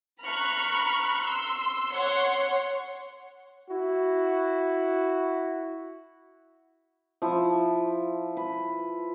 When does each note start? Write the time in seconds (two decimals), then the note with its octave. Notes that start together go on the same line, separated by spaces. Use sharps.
0.21 A#5 B5 C#6 F6 F#6
1.20 C6 E6
1.92 C#5 F#5 C6 C#7
3.69 E4 F#4
7.22 F3 E4
8.37 B4